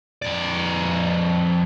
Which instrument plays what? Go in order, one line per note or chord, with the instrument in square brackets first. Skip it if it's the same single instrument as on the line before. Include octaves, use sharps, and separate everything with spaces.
[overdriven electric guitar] F2 D5